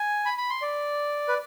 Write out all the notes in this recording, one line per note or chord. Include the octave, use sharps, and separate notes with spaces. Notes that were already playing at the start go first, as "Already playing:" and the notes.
Already playing: G#5
B5
B5
C6
D5
B4